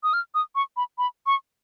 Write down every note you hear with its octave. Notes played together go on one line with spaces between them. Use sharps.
D#6
F6
D#6
C#6
B5
B5
C#6